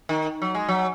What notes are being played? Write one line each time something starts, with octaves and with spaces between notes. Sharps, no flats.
D#3
F#3
G#3
F#3